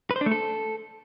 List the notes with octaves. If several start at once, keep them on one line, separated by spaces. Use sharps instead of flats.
B4
C5
D4
A3
A4